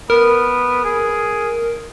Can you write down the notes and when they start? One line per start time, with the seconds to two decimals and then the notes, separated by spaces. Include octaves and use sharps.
0.10 B3 A#4
0.84 G#4